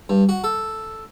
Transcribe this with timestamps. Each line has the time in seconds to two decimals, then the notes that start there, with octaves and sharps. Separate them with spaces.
0.09 G2
0.29 F#4
0.44 A4